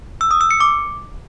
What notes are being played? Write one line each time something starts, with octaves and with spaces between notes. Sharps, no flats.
E6
D#6
E6
C#7
D6